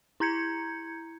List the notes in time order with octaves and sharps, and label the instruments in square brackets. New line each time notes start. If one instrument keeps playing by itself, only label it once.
[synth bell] E4 A#5 G6 G#6 C#7